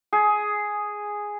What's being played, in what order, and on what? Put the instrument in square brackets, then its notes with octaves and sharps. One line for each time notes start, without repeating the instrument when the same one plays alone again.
[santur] G#4